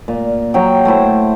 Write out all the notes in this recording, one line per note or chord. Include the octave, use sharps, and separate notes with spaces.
A#2
F#3 G5
A3 E4 C5